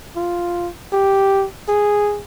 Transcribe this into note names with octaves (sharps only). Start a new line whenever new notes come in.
F4
G4
G#4